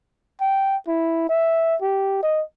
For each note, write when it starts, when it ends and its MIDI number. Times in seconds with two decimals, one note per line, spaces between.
0.41 0.76 79
0.87 1.26 64
1.29 1.76 76
1.82 2.22 67
2.23 2.42 75